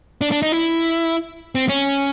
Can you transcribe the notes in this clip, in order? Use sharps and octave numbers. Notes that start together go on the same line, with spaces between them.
D4
D4
D#4
E4
C4
C#4